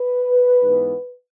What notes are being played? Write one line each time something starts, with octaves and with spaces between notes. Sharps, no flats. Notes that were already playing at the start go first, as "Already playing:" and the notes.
Already playing: B4
G#2 E3 B3